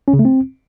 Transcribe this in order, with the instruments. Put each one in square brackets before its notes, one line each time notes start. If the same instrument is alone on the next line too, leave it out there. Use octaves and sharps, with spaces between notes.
[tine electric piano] C#4
C#3
A3
C4